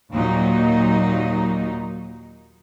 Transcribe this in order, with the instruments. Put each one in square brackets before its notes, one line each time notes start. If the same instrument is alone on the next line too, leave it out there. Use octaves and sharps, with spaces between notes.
[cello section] D#2 A#2 F#3 D#4